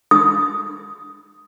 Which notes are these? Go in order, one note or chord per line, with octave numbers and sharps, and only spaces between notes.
D#6